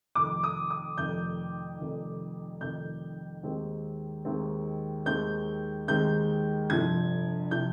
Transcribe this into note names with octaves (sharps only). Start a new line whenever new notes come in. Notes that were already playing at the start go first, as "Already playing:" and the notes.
F1 F2 D#3 D6
D#6
D#6
F1 F2 D#3 G6
F1 F2 D#3
F1 F2 D#3 G6
D#2 D#3 G#3 C4
D#2 D#3 G#3 C4
D#2 D#3 G#3 C4 G6
D#2 D#3 G#3 C4 G6
G1 F2 C3 F3 G#6
C3 F3 G6